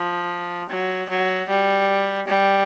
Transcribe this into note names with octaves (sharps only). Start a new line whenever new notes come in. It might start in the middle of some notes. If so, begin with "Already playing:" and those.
Already playing: F3
F#3
F#3
G3
G3